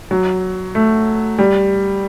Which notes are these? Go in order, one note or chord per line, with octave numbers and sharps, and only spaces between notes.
F#3
A3
G3